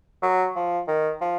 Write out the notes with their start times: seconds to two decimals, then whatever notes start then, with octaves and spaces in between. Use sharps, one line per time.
0.22 F#3
0.55 F3
0.87 D#3
1.21 F3